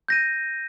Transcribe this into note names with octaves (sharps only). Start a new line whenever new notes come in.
G6 A#6 D#7